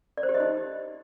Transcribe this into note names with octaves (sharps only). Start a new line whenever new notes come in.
D5
C5
G4
D#5
D#4